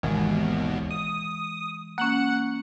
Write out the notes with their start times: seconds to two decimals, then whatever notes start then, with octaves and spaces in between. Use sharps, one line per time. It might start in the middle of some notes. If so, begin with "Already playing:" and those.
0.03 G#1 D#2 B2 E3 G#3
0.91 D#6
1.98 A#3 C#4 F#5 F#6 C#7